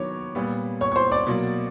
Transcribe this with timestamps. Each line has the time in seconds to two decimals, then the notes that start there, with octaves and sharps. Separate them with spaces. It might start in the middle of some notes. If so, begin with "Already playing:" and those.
Already playing: D#3 F#3 B3 C#5 D6
0.35 A#2 G3 B3
0.81 C#5 C#6
0.92 C#6
0.96 C5 C6
1.12 D5 D6
1.27 B2 F#3 A#3